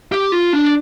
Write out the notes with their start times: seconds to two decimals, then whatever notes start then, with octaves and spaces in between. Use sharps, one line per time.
0.12 G4
0.32 F4
0.53 D4